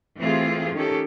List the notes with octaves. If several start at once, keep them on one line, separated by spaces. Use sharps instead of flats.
E3 A3 C4 F4 G4 G#4
D#3 C#4 G4 A4